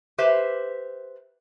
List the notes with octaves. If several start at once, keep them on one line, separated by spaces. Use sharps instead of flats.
G4 B4 C5 E5